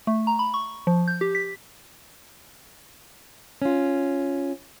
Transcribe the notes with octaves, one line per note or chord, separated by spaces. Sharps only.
A3
A#5
B5
C#6
F3
G6
G4
B6
C#4 F4